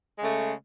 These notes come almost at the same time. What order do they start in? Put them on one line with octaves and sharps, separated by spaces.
G#3 C#3 A3